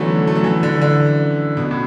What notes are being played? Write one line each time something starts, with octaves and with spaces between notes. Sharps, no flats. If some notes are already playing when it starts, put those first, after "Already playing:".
Already playing: B2 D3 E3 F#3 A3
A3
F#3
E3
D3
D3
B2
A2